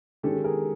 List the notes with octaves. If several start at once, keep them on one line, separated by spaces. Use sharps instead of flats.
D#3 G#3 C#4 G4 A4
G#4 A#4